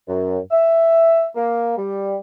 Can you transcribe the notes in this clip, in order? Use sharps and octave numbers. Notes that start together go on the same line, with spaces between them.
F#2
E5
A#3
G3